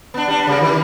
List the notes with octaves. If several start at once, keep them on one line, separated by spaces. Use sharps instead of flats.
B3 D4
G3 D4
C#3 G3 A#3
D#3 E3